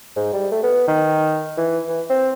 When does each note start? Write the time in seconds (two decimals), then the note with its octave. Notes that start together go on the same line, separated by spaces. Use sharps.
0.16 G#2
0.33 G3
0.52 A3
0.63 B3
0.88 D#3
1.57 E3
1.88 E3
2.10 C4